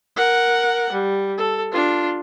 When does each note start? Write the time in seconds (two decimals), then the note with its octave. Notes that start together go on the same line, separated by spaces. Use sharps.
0.17 A#4 F#5
0.92 G3
1.38 A4
1.72 D4 F4